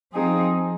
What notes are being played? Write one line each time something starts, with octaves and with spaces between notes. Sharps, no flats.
F3 C4 D#4 G#4